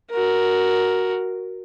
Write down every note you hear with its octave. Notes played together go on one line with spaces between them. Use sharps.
F#4 A#4